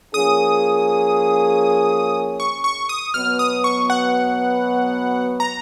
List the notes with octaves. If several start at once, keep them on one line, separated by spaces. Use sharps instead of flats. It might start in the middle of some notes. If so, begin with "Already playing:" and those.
F3 A#3 C#4 G#4 D#6
C#6
C#6
D#6
B2 F#3 B3 F6
D#6
C#6
F#5
A#5